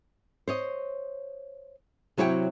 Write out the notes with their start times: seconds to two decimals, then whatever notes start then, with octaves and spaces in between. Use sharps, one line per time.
0.48 C5 C#5 D#5
2.17 C3 F#3 E4 C#5 D5 G5